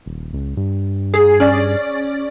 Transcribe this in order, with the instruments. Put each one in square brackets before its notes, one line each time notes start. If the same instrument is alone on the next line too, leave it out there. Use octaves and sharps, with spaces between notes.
[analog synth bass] D#1
C#2
G2
[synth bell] G#4
C#4 D5 A6